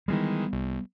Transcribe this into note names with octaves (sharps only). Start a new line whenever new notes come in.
D#3 E3 G3 G#3 B3
C2